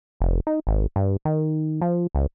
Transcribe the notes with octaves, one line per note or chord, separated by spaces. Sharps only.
F1
D#4
G#1
G2
D#3
F3
C#2